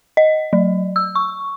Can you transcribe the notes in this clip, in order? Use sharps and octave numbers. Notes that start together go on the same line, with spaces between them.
D#5
F#3
E6
C#6